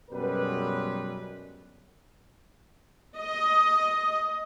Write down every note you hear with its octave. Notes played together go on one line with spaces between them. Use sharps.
F#2 B2 G3 G#3 B4
D#5